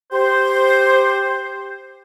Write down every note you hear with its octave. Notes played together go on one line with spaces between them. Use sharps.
G4 C5